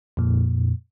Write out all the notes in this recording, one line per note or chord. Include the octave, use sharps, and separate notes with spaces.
F2 A#2